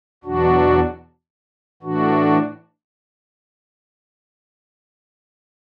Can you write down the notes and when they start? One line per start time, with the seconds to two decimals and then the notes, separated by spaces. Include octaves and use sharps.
0.24 E2 B2 F#3 D4 F#4
1.83 A2 E3 D4 F#4